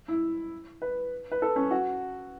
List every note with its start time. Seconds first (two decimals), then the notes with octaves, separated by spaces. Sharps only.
0.08 E4
0.82 B4
1.32 B4
1.42 A4
1.56 C#4
1.71 F#4